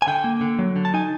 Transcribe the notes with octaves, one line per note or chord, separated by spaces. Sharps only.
G#5
D3 G5
A#3
D3
F#3
D3
A5
D#4 G#5